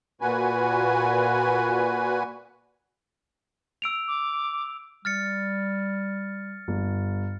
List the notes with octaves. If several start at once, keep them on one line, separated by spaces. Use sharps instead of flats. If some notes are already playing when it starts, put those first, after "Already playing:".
A#2 F#4 B4 G#5
E6 D7 F7
D6
G3 F6 A6 C#7
G1